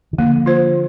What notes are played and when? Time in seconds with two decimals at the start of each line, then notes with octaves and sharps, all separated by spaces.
0.13 D#3
0.18 D3 F3 A#3
0.46 F4 C5